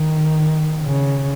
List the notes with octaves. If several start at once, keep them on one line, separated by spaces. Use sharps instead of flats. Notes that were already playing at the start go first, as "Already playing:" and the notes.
Already playing: D#3
C#3